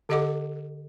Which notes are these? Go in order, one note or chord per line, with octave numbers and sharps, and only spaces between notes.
D3 G4 A4 D#5 F#5 D6